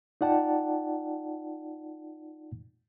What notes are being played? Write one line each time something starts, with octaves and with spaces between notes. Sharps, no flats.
D#4 F4 D5 F#5 G5 A5